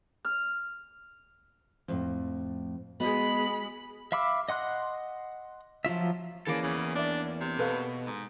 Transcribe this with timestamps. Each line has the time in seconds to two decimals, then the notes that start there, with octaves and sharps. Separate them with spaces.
0.25 F6
1.88 F2 A2
3.00 G#3 B3 F#4 D#5 B5
4.12 E5 F5 B5 D6 E6
4.49 D#5 F#5 C6 F#6
5.85 F3 F#3 F4 E5
6.47 E3 A#3 C#4 G#4 A4 D5
6.63 E2 C#3
6.95 D4 D5 E5
7.40 C3
7.59 B2 A4 B4 F5
8.06 G#2